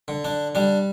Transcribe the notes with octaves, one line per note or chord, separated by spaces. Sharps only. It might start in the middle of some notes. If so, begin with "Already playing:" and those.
D3
D4
G3 D4